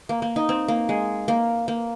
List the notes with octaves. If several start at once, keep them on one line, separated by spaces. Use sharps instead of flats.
A#3
A#3
D#4
C4
A#3
G#3
A#3
A#3